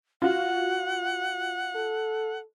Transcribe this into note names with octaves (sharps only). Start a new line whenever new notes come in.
F4 F#4 F#5
A4